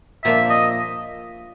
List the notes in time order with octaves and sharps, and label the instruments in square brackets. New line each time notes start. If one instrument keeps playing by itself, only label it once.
[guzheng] A#2 F3 A#3 D4 [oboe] E5
[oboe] D#5